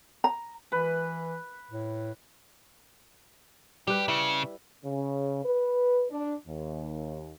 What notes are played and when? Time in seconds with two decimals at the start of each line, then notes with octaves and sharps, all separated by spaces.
0.24 A#5
0.72 E3 B4
1.71 A2
3.87 G3 G4 B4
4.08 C#3 E4
4.84 C#3
5.45 B4
6.11 D4
6.48 D#2